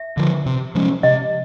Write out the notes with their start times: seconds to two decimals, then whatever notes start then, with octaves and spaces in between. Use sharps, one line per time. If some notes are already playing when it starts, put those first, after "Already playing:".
Already playing: E5
0.17 D3 F3
0.46 C3
0.75 F3 G#3 C#4
1.03 C3 D#5